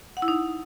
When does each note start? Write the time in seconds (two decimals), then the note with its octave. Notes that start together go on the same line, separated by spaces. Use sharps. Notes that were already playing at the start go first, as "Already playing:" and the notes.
0.17 F#5
0.22 E4
0.28 D#4